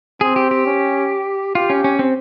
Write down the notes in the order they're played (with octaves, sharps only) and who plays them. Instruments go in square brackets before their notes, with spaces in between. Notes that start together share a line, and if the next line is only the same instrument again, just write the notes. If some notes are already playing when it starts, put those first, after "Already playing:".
[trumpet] C4 [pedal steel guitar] G#4
[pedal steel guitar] G4
G4
[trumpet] C#4
[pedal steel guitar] F4 [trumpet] G4
[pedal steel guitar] C#4
C#4
C4